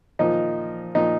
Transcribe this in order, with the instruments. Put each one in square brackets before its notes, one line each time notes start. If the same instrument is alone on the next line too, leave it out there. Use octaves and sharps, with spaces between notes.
[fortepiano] A#2 F3 A#3 D#4
A#2 F3 A#3 D#4